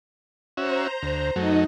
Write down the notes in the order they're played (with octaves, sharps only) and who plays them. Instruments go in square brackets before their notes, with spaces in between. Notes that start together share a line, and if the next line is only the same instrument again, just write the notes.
[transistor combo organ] C#4 F#4 E5 [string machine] C5 A#5
[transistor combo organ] D2
[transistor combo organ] F#2 F#3 A3 [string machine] D#4 D#5